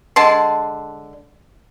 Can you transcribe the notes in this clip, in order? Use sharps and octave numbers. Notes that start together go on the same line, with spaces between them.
D3 G#3 A5 C6